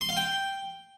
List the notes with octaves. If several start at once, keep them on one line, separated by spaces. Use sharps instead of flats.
C6
F5
G5